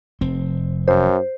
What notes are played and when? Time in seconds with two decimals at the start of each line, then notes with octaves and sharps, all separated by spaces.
0.21 F1 C4
0.88 F#2 C5